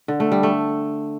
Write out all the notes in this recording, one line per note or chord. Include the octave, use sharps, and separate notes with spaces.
D3
A3
G3
A3